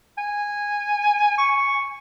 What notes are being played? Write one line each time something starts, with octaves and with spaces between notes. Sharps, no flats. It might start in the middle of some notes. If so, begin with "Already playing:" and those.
G#5
C#6